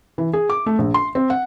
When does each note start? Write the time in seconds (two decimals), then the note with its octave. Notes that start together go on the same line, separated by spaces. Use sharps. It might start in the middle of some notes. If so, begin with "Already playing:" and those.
0.18 E3
0.33 G#4
0.50 D6
0.66 A3
0.78 A#1
0.94 C6
1.15 C4
1.30 F#5